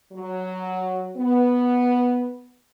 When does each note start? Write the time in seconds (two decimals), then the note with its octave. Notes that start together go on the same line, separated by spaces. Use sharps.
0.13 F#3
1.17 B3